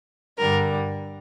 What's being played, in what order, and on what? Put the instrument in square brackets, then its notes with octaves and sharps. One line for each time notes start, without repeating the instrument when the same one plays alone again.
[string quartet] G2 D3 G3 A#4